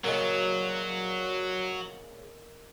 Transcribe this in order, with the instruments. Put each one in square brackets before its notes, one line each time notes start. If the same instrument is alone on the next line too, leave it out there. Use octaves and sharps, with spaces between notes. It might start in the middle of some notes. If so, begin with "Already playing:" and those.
[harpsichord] A#2 C#3 [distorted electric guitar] F#3 [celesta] A#4 D#5